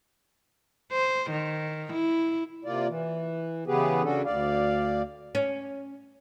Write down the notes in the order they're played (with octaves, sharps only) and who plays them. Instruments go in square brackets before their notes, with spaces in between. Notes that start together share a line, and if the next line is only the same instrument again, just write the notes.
[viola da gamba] C5
D#3
E4
[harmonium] C3 A#3 F4 D5
E3
C#3 E3 B3 G4 G#4 B4
C#3 C#4 D4 F#4 A4
D2 D5 F5
[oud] C#4